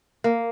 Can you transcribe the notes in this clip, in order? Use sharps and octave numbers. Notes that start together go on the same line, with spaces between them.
A#3